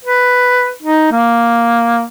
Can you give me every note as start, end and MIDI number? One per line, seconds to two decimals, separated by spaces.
0.05 0.70 71
0.82 1.07 63
1.12 2.04 58